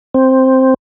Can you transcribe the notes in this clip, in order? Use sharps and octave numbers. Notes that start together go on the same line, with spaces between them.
C4